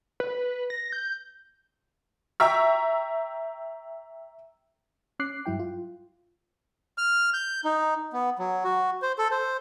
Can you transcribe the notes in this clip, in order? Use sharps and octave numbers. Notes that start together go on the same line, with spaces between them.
B4
A#6
G6
E5 G5 A#5 C#6 E6
C#4 D6 F#6 C7
G2 F#3 E4 G5
F4
F6
G6
D#4
B3
F#3
F#4
C5
A4
C5